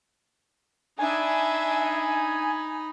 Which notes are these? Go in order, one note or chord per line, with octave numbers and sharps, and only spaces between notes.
D4 D#4 E5 G#5 B5